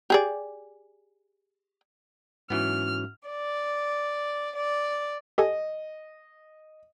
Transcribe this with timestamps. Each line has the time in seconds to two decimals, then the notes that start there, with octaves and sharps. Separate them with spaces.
0.10 G4 G#4 D5
2.50 G#2 E3 F#3 B3 C#4 F#4 F6
3.29 D5
4.57 D5
5.38 G4 A4 D#5 G#5